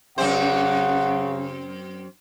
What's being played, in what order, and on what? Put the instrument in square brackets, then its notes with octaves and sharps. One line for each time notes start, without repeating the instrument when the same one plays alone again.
[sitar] F#2 C4 C5 [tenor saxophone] C#3 [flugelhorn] F#5